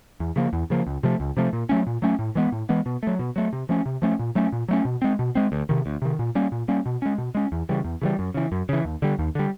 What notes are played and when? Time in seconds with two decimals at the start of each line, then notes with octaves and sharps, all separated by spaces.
0.20 E2
0.36 C#3 F3 A#3
0.53 E2
0.70 C#3 F3 A#3
0.87 C#2
1.03 C3 F3 A3
1.20 C#2
1.37 C3 F3 A3
1.53 A#2
1.69 F#3 A3 C#4
1.87 A#2
2.02 F#3 A3 C#4
2.19 A2
2.35 E3 G#3 B3
2.52 A2
2.69 E3 G#3 B3
2.86 B2
3.03 F#3 A3
3.19 B2
3.36 F#3 A3
3.53 C3
3.69 F3 A3 C#4
3.86 C3
4.02 F3 A3 C#4
4.19 A#2
4.35 F#3 A3 C#4
4.52 A#2
4.68 F#3 A3 C#4
4.85 B2
5.02 G#3 C4
5.19 B2
5.35 G#3 C4
5.52 D2
5.69 C3 D#3
5.86 D2
6.02 C3 D#3
6.19 A#2
6.35 G3 A#3 C#4
6.52 A#2
6.68 G3 A#3 C#4
6.86 B2
7.02 G#3 C#4
7.18 B2
7.35 G#3 C#4
7.52 E2
7.69 C#3 E3 G3
7.85 E2
8.02 C#3 E3 G3
8.19 F#2
8.34 C#3 E3
8.52 F#2
8.69 C#3 E3
8.85 D#2
9.02 D3 G3
9.19 D#2
9.35 D3 G3